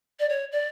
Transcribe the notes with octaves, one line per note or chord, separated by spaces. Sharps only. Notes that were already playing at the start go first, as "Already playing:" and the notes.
D5
C#5
D5